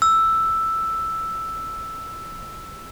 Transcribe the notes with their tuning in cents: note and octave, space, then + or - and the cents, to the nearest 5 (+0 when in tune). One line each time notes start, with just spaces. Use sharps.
E6 +5